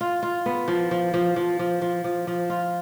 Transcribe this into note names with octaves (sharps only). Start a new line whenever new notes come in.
F4
F4
B3
F3
F3
F3
F3
F3
F3
F3
F3
F4